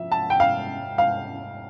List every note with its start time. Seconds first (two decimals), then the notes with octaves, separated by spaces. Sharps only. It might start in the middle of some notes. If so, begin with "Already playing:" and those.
Already playing: F3 E5
0.12 A5
0.30 G5
0.40 F5
0.98 F5